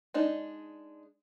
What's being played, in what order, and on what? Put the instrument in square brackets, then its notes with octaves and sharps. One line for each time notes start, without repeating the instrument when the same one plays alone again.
[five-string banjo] G#3 D4 D#4